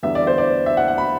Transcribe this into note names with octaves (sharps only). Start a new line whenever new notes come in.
E2 D3 G3 B3 E5
D5
C5
D5
E5
F#5
F#5
B5